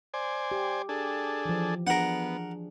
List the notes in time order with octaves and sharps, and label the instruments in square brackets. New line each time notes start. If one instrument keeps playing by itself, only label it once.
[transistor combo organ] C5 D5 G#5
[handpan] G4
[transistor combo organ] D4 G#4 A4
[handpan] E3 F3
[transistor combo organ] B3 [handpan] D4 F4 G#4 [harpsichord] A#4 F#5